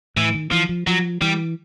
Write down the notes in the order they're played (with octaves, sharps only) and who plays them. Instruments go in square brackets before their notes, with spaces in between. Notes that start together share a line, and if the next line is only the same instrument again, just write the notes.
[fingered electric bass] A2 [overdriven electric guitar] E3
[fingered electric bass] D#3
[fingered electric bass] E3 [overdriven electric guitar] F3
[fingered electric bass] F3
[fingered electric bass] F3 [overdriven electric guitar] F#3
[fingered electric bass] E3 [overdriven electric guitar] G3